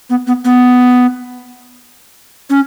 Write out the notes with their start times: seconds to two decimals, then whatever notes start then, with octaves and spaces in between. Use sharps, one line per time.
0.10 B3
0.27 B3
0.45 B3
2.50 C#4